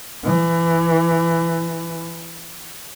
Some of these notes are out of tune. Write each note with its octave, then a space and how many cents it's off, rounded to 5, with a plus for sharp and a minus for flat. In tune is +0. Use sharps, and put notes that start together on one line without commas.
E3 +20